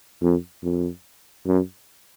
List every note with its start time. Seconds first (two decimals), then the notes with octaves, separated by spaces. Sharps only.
0.22 F2
0.63 F2
1.47 F#2